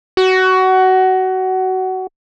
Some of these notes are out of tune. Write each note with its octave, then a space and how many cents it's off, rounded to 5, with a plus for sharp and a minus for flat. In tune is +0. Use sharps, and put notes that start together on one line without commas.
F#4 +20